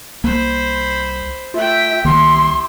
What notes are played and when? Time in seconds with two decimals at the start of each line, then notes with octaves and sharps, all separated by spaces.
0.24 C2 A#3 C5 B5
1.54 A3 F4 E5 G5
2.05 C2 D#3 A#3 E4 G4 C6